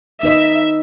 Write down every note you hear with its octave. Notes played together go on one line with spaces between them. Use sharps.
D#4 B4 D#5 E5